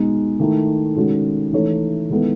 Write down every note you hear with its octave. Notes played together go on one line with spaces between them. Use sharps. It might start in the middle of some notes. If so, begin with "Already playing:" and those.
Already playing: B2 G#3 D#4
D#3 A3 E4
D#3 G#3 C#4 F#4 A4
E3 A3 D#4 A4 C#5
D#3 G#3 B3 E4 A4